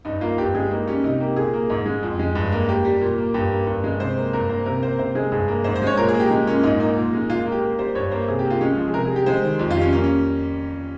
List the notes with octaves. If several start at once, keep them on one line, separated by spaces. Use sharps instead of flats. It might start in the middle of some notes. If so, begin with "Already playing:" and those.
G2 D#4
A#3 F4
G2 G4
G#3 G#4
A#3 D#4
G3 C#4
C3 D#4
A#3 G4
A#2 G#4
A#3
G#2
G#3
F2
G#3
G2
A#3
A#3 G4
G3
A#2
A#3
G2 G4
A#3
G2
G#3
C3 C5
A#3
G2 A#4
A#3 C5
C3 A#4
A#3 C5
C3 C5
G#3 G#4
G2 G#4
A#3
G#2 C5
C5
G#3 C#5
A#2 A#4
G#4
A#3
G4
G#3
A#2 C#4
G#2 D#4
A#3 D#4
A#2
G#3
A#2 F4
F4
A#3
G4
A#3
G3 C5
G2 C#5
A#3 C5
C3 G#4
G4
A#3
F4
G#3 C#4
C#4
F3
G#4
C3 A#4
G#4
G3
G4
G#3 C5
D#3
F2
F4
G3
C#4
A#3 C#4
C#4